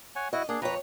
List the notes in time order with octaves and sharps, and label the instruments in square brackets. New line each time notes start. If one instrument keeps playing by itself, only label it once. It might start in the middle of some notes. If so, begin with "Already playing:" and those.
[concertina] C#5 F#5 G#5
[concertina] E4 F#4 [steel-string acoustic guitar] D#5
[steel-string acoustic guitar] A#3 [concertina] D4 G#4
[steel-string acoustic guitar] F2 C#5 [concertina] B4 A#5